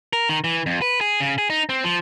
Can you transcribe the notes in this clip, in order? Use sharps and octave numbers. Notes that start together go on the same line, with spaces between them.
A#4
D#3
E3
F2
B4
G#4
C#3
G#4
D#4
C4
F3